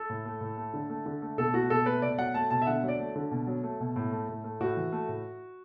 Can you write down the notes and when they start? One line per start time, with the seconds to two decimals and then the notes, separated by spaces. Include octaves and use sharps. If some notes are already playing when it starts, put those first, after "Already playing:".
Already playing: A4
0.10 A2
0.26 A3
0.41 A2
0.57 A3
0.74 D3
0.90 A3
1.06 D3
1.22 A3
1.38 B2 A4
1.54 A3 F#4
1.70 B2 A4
1.86 A3 B4
2.02 B2 D5
2.18 F#3 F#5
2.34 A3 A5
2.50 B2 A5
2.62 E5
2.67 D3 F#5
2.83 F#3
2.88 D5
2.99 A3
3.16 D3
3.31 B2
3.47 F#3
3.64 A3
3.80 B2
3.96 A2
4.12 A3
4.29 A2
4.44 A3
4.60 A2 F#4
4.77 E3
4.92 A3
5.08 A2